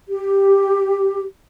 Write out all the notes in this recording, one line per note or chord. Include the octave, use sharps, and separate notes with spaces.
G4